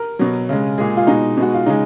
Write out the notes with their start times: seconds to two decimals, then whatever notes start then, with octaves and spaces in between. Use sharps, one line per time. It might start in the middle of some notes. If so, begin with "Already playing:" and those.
Already playing: A#4
0.19 B2 F#3
0.49 C#3 G#3
0.78 A#2 G#3 G#4
0.97 F4
1.07 B2 G#3 D#4
1.37 B2 G#3 F#4
1.54 F4
1.66 C#3 G#3 D#4